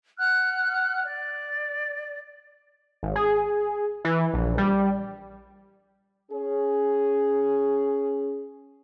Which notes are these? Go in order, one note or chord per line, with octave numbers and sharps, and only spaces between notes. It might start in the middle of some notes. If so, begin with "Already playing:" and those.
F#5 F6 F#6
D5
G#1
G#4
E3
A#1
G3
C#4 G#4